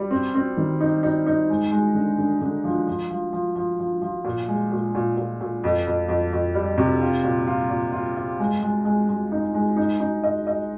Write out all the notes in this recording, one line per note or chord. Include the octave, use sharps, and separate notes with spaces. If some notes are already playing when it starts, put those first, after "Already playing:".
Already playing: G3
C4
C4
D#3
D#4
D#4
D#4
G#3
G#3
D3
D3
D3
F3
F3
F3
F3
F3
F3
F3
A#2
G#3
A#2
A#2
A#2
A#2
F2
F2
F2
F2
G3
C3
F4
A#2
F4
A#2
F4
F4
G#3
G#3
G#3
G#3
D#4
G#3
D#4
D#4
D#5
D#5